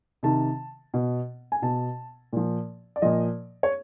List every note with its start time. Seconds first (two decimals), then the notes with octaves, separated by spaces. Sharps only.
0.23 C3 D#3 A5
0.94 B2
1.52 G#5
1.62 B2 A5
2.33 A#2 F3
2.96 D5
3.02 A#2 F3 D#5
3.63 C#5